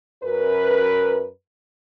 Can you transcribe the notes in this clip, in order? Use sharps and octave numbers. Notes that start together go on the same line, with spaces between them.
F#2 A#4 B4